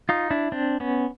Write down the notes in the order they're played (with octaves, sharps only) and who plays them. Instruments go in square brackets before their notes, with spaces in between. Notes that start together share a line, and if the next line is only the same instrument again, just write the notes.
[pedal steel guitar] D#4 F4
D4 E4
C4 D4
B3 C#4